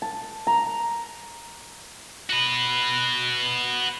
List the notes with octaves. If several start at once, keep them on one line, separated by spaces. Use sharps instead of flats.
A5
A#5
F#4 B4